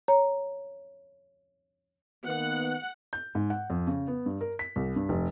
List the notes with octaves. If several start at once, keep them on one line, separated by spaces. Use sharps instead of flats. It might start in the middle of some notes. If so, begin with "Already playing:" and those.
C#5 A#5
D#3 A#3 B3 F#5
G6
G#2
F#5
F2
C#3
B3
G2
A#4
B6
C2
G2
F1